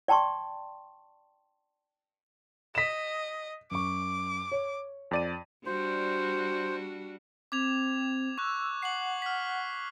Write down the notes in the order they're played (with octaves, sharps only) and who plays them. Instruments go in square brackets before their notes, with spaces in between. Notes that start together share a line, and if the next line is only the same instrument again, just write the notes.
[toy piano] D5 G5 A5 C6 C#6
[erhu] D#5 [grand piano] B6 E7
[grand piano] F#2 C#6 [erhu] D6
[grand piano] C#5
[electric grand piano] F2 D5 D#7
[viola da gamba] G3 D4 F#4 [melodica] C5
[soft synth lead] C4 [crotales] D6 G#6 F7
[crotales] C#6 F#6 [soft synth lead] E6
[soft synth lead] F#5 [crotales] C7 F#7
[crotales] F6 B6